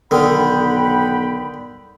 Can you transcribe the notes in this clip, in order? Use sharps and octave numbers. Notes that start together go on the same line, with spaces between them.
B1 D3 D#3 F#5 G5 B5